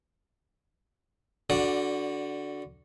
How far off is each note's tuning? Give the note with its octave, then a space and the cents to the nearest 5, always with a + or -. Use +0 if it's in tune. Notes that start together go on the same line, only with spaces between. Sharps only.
D3 -10 F#4 +0 D5 +10